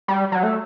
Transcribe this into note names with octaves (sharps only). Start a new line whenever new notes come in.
G3
F#3
A3